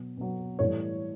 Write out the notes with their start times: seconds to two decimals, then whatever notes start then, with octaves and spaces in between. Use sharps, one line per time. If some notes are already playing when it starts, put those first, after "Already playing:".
Already playing: B2 F#3
0.17 B2 F#3
0.59 A2 E3 G3 C#5